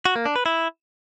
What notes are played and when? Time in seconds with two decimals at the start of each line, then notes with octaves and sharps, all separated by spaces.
0.05 F#4
0.16 A#3
0.26 D4
0.36 B4
0.46 E4